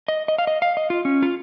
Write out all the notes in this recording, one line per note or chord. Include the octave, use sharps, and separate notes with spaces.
D#5
D#5
F5
D#5
F5
D#5
F4
C#4
F4